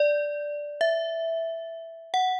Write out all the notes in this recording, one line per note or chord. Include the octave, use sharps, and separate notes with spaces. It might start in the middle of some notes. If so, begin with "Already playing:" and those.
Already playing: D5
E5
F#5